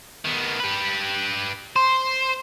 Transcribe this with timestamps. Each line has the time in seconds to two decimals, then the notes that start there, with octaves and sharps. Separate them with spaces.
0.24 D#3 B3
0.60 G4 B4
1.76 C5 C6